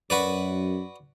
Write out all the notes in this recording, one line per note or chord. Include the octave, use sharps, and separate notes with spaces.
F#2 F#4 B4 D5